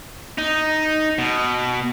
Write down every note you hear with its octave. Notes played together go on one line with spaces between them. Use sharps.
D#4
B2